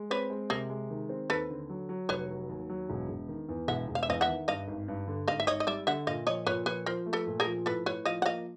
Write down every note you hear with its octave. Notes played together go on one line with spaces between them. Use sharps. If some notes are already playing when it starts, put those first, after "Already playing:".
Already playing: G#3
C4 B4 C#5
G#3
C3 G#4 A#4
G#3
D#3
C4
D#2 A4 B4
D3
F#3
F#3
F1 B4 C#5
F#3
D#2
F#3
E1
E1
D#3
E2
E1 E5 F#5
E1
F5
E5
E2 D#5 F5
E5 F#5
D#3
G2 D#5 F5
G#1
G2
D3
G#1 D#5 F5
E5
G#1 C#5 D#5
D#5
G3 D5 E5
D3 E5 F#5
A#2 D#5 F5
F3 C#5 D#5
A#2 B4 C#5
F3 B4 C#5
F3 A#4 C5
A3
A4 B4
A#2
G#4 A#4
F3
A2 A4 B4
A2 B4 C#5
F3 D#5 F5
F#5
A#3 D#5 F5